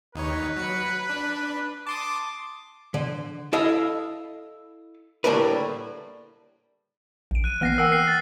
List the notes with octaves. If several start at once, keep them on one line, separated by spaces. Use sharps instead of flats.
D#2 D#4 B4 C#5
F#3 C#7
D4
A5 C6 D6 D#6
D3
E4 A4 D#5 F5
A2 D3 G3 A#3 A#4 B4
A#1 D7
F#6 D#7
E3 A#3 B3 F6 A#6 C7
A#4 F#5 G5 E6 G7
F#6 C7
A6